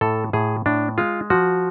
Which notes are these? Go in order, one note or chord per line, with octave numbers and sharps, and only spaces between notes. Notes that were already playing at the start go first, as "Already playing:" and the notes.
A2 A4
A2 G#4
A2 D4
G#3 F4
F3 F#4